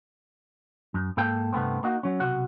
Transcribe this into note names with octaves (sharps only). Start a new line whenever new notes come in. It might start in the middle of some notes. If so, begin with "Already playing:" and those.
F#2
G#2 A#3 A4 G5
G2 C3 A3 B3 C4
A#3 D#4 F#4
F#3 C#4
B1 C3 F#4 F#5